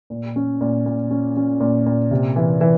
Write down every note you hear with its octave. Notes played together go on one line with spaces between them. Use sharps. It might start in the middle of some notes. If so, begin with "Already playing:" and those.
A#2
C#4
A#2
A#2
C#4
C#4
A#2
A#2
C3
E3
E3